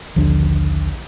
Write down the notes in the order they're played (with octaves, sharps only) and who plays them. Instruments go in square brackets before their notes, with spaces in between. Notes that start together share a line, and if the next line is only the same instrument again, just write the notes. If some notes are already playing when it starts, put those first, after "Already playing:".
[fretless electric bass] A#1 D#2 D3 D4